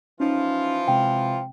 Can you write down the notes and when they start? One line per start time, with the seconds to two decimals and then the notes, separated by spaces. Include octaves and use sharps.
0.20 E3 F3 C#4 D#4 F4
0.88 C3 G#3 C4 G5